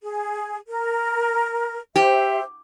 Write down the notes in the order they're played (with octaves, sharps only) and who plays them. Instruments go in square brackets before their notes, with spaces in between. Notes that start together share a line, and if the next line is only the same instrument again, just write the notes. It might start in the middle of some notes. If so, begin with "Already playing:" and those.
[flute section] G#4
A#4
[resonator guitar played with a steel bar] G4 [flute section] C5 E5